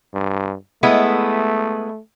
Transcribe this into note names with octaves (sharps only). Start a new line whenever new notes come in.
G2
G#3 A3 B3 E4